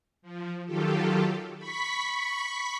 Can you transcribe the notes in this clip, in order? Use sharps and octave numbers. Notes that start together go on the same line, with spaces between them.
F3
D#3 F#3 F4 G4 A4
B5 C#6 B6